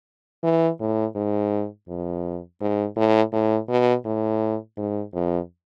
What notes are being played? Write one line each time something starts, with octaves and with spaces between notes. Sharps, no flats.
E3
A2
G#2
F2
G#2
A2
A2
B2
A2
G#2
F2